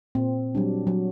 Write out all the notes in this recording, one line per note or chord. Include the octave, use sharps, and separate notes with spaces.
A#2 C4
F#3 G3 D4
F#3